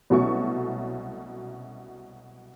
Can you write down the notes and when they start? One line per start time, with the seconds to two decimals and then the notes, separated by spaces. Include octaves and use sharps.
0.10 C2 B2 F#3 A3 C#4 C#6